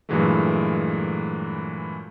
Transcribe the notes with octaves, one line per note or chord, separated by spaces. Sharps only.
G2 A#2 E3 F#3 G#3 A3